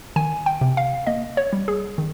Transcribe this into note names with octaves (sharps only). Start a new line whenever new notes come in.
D#3 G#5
G5
C3
F5
A#3 D#5
C#5
G3
G#4
D#3